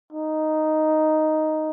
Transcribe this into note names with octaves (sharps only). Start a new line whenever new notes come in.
D#4